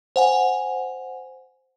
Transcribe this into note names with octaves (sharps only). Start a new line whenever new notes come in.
C5 F#5 G#5